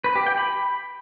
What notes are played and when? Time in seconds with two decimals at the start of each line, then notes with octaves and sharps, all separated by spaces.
0.04 B4
0.15 G4
0.27 G5
0.38 B5